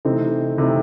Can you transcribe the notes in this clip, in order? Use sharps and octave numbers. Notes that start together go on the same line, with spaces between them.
C3 E3 A3 C4 D#4
C3 E3 A3 C4 D#4